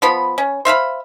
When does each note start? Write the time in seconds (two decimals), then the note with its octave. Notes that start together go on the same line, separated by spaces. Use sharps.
0.02 F3 B3 B5
0.38 C#4
0.65 C5 E5 F5 B5